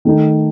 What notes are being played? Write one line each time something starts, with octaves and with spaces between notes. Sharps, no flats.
D#3 A3 D#4